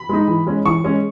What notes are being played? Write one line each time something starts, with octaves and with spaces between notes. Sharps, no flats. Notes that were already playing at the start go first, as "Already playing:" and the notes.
Already playing: B5
G#3 D#4
E3
G#3 C#4
E3 C#6
G#3 C#4